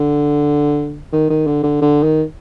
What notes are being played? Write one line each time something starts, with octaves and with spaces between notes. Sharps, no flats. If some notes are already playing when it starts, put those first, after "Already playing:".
Already playing: D3
D#3
D#3
D3
D3
D3
D#3